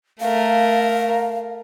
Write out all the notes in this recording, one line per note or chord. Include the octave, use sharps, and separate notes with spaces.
A3 A#4 F5